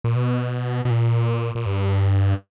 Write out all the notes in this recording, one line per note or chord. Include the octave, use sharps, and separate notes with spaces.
A#2
B2
B2
A#2
A#2
G2